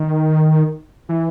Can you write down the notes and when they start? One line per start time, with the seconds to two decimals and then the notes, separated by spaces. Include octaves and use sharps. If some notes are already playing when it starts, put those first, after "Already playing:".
Already playing: D#3
1.09 E3